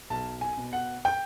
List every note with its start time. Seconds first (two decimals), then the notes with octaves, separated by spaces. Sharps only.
0.10 B1 A5
0.41 G#5
0.57 B2
0.73 F#5
1.05 G5